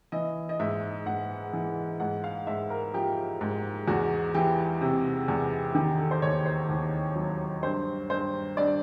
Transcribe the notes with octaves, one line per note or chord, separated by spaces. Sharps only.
E3 D#5
D#5
G#2 E5
G#2 F#5
E3
G#2 F#5
F5
G#2 E5
A#4
F3 G4
G#2
E2 F#4
E3 G4
C3
E2
D#3 G4
A4
C5
D#2 C#5
C5
D#2
F#3
G2 C5
G2 C5
G2 D5